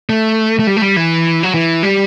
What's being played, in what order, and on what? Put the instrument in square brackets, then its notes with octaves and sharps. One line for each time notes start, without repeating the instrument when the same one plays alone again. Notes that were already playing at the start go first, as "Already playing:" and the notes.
[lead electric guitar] A3
A3
G3
A3
G3
E3
F#3
E3
G3